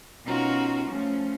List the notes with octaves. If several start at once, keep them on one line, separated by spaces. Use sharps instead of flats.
B2 C#4 D#4 F4 F#4 A#4
F3 A3 C#4